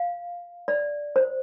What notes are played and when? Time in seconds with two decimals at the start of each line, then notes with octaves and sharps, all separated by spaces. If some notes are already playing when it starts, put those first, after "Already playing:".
Already playing: F5
0.68 D5
1.16 C5